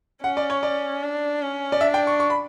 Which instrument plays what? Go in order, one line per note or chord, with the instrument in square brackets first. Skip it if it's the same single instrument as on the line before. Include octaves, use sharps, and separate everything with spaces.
[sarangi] C#4 [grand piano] F#5
[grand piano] D5
C#5
D5
[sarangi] D4
C#4
[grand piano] D5
[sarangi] D4 [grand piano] E5
[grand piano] G5
C#6
C#6
B5